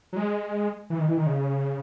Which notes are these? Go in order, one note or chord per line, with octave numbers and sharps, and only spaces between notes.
F#3
G#3
E3
D#3
E3
D#3
C#3